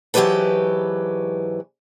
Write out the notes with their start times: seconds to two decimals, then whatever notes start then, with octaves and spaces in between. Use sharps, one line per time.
0.14 G#2 E3 F#3 G4 B4 A5